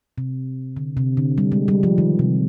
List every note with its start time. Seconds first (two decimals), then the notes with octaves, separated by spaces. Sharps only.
0.18 C3
0.77 D3
0.97 C3
1.17 D3
1.38 G3
1.52 G#3
1.68 G3
1.83 F3
1.98 D#3
2.19 C3